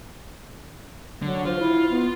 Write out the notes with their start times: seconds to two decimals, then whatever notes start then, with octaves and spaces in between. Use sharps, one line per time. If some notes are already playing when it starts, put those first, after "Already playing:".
1.22 D3 F#3
1.46 F4 C5
1.59 E4
1.90 B3